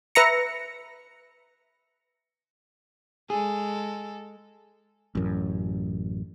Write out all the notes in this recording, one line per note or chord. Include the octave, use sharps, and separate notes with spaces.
B4 E5 A#5 A#6 C#7
G#3 G#4 A4
A1 F#2